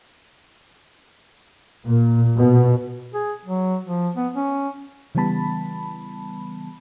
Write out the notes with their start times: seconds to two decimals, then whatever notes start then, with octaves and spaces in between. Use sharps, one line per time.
1.86 A#2
2.37 B2
3.14 G#4
3.46 F#3
3.85 F3
4.16 B3
4.36 C#4
5.15 C#3 E3 G3 B3 A5 B5